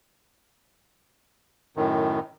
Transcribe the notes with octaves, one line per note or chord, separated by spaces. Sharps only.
F#2 A2 D#3